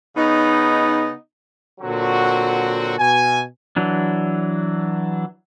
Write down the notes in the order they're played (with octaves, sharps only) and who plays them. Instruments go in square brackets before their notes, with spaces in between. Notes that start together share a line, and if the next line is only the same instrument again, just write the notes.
[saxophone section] C#3 B3 D#4
[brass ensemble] A#2 D3 F#3 C4 F#4
B2 G#5
[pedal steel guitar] E3 F#3 D4